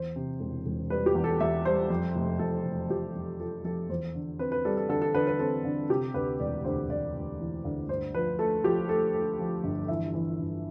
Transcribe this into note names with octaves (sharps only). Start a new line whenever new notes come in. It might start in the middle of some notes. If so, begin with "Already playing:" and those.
Already playing: E2 C5
C3
E1
E1
G3 B4
G4
E2
A4
E2 E5
G3 C5
F2
F1
F2 A4
F1
F2 G4
F2
F3 A4
F2 A4
E2 C5
D3
C4 B4
B4
G3 A4
A4
D3 A4
A4
D3 B4
B4
C4 A4
D3
C3 G4
D2 B4
E1 D5
D2 C5
D2 D5
D2
E3
D2
G2 C5
F3 B4
A3 A4
F3 G4
A3 A4
A3
F3
G1
E3 E5
E3
G1